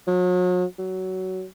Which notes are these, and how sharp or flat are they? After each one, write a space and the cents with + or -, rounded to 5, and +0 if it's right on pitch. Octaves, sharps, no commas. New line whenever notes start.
F#3 -40
F#3 +15